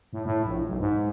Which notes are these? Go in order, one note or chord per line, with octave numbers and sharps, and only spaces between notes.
A2
A2
A#1
B1
G#2